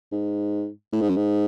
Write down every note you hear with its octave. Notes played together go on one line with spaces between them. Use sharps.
G#2
A2
G#2
F#2
G#2